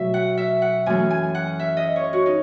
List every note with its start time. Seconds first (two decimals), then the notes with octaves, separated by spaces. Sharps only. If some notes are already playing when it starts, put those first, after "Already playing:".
Already playing: B2 F#3 A3 E5
0.14 F#5
0.37 E5
0.62 F#5
0.86 F#2 E3 A3 G#5
1.10 G#5
1.35 F#5
1.59 E5
1.77 D#5
1.96 C#5
2.13 F#4
2.26 D#4